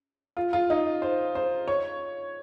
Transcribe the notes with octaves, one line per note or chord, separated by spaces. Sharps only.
F4
F4
D#4
C5
C5
C#5